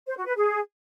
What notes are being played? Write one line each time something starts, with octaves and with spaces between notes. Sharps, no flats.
C5
F#4
B4
G#4